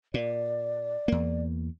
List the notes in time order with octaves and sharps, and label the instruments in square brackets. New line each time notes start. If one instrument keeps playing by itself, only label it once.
[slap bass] A#2 [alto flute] D5
[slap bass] E2 A#3